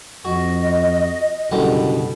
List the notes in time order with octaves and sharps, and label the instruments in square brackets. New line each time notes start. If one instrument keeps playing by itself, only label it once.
[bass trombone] F2 [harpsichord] F#4 [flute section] D#5
[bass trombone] F#1 [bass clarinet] B2 [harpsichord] D3 G3 F#5